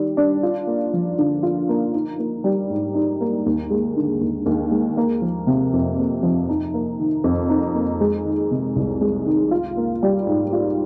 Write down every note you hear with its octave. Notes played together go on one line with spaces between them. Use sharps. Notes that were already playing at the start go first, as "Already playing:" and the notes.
Already playing: D#3 G3
D4
F4
A#3
F3
D3
F4
A#3
D#4
A#3
G3
G#2
D#4
A#3
D#2
G#3
D3
D#2
D#2
G#3
A#3
F3
C3
F2
A#3
F3
D#4
A#3
D#3
F2
D#4
A#3
G#3
D#3
C3
C2
G#3
D#3
F4
A#3
G3
G#2
F4